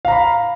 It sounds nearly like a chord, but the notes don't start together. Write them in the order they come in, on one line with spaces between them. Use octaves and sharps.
F5 A#5 B5